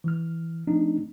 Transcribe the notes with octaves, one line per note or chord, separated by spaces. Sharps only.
E3 F6
F3 A3 C4 D4 D#4